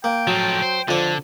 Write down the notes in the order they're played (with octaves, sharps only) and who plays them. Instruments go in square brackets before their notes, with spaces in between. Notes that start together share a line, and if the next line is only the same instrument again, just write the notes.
[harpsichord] A#3 [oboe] G5
[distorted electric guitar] A2 F3 [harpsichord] F#3
[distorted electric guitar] C5
[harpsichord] F2 D5 [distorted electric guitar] D3